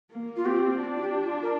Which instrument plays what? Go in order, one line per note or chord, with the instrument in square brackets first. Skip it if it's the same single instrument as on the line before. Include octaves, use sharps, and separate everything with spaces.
[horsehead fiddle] A#3
[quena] F4
[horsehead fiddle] C4 [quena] G4
[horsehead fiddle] D4
[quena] F4
G4
F4
A#4